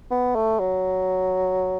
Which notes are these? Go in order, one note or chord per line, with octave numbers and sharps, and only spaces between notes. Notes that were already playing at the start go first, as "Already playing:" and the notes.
B3
A3
F#3